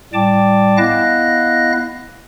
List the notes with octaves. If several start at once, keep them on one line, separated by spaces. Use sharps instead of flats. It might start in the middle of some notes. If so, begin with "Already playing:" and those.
A2 G3 D5 G5 A5 D6
B3 E4 D#5 F5 F#6 A#6